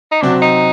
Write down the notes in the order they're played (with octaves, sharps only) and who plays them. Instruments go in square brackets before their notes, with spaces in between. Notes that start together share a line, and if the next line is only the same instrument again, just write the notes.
[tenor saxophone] D#4
[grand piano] C3 F#3 C4 F#4 [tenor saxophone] D4
[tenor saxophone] D#4